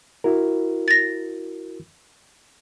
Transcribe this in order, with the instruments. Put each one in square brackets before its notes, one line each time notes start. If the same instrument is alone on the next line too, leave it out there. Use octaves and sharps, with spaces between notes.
[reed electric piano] E4 F#4 A#4
[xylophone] A6 A#6